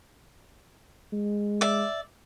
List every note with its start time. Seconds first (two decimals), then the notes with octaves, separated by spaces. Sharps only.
1.13 G#3
1.61 D5 E5